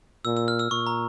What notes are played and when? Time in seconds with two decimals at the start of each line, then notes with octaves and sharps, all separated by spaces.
0.25 A#2 E6
0.37 E6
0.48 F6
0.59 E6
0.71 A#2 C#6
0.87 A#5